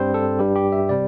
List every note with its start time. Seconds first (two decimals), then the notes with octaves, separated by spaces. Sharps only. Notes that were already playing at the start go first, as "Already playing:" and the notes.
Already playing: G2 G3 C4 C5
0.14 A4
0.39 G2 G3 D4 G4
0.56 G4
0.72 E5
0.89 C3 G3 C4 D5